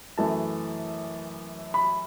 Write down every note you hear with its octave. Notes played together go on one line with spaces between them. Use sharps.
F#2 E3 A3 A5
B5